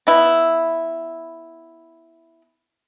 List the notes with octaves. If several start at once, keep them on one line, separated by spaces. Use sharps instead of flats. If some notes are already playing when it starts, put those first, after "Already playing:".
B3 E4